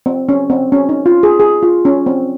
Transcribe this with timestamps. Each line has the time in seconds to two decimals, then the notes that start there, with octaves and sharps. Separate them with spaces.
0.06 C4
0.29 C#4
0.50 C4
0.72 C#4
0.89 D#4
1.06 F4
1.23 G#4
1.40 G#4
1.63 F4
1.85 C#4
2.06 C4